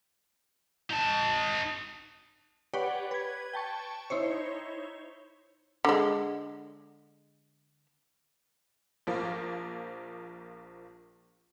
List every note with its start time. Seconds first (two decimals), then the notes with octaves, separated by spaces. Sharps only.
0.91 D#4 A5
2.74 G4 B4 C#5 D5 F#5 G5
3.11 B4 G#6
3.53 G5 A5 C#6
4.10 D#4 E4 C5 C#5
5.85 D3 G#3
9.07 A#1 F3 A#3